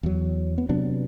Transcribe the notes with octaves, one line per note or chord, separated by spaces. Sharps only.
E2 F#3
B3
C3 F#3 B3 D4